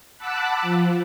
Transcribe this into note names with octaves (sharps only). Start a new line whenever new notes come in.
F#5 A5 B5 D6 E6 F#6
F3